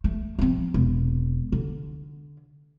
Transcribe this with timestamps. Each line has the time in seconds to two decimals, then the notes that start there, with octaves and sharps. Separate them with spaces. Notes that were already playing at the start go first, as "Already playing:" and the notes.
0.04 A3
0.39 F3 C4
0.74 E1
1.52 D3